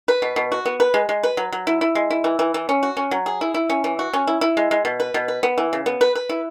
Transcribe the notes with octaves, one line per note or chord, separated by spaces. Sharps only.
B4
B2
B2
F#4
B3
B4
G#3
G#3
B4
F#3
F#3
E4
E4
G#3
E4
E3
E3
E3
C#4
F#4
C#4
F#3
G#4
E4
E4
C#4
E3
F#4
C#4
E4
E4
G#3
G#3
B2
B4
B2
B4
B3
E3
C#3
B3
B4
B4
E4